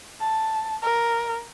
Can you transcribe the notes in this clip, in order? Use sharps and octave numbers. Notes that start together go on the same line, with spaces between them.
A5
A#4